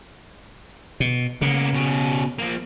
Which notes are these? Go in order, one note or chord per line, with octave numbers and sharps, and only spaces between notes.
B2
C#3 A#3 B3
B2 C#4
F3 A#3